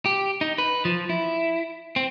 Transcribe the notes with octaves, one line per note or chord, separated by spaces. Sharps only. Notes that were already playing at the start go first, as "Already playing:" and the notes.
G4
D#4
B4
F3
E4
C4